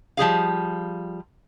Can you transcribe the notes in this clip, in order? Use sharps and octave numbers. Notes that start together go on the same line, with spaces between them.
F3 G3 G#4 F5